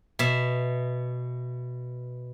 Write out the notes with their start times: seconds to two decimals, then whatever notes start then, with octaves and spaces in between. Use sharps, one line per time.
0.19 B2 E5